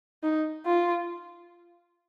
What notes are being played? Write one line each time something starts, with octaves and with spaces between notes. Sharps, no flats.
D#4
F4